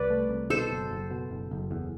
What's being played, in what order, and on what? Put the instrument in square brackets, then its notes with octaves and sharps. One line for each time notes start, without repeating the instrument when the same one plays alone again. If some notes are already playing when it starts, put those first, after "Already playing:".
Already playing: [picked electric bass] C2 [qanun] B4 D5
[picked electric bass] A3
C2
[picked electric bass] B2 [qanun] A4 C5
[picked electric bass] F#1
F#1
B2
F#1
F#1
E2